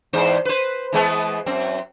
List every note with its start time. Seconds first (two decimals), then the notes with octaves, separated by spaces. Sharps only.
0.13 E2 G#2 C5
0.45 B4 C5
0.92 E3 G#3 B3
1.46 F#2 C4